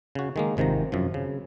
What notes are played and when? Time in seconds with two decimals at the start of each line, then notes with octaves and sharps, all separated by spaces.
0.15 C#3 F#4
0.36 D#3 G#3 A#3
0.57 G#1 C3 D#3 F3 A#5
0.92 F#2 C3 F3
1.14 C#3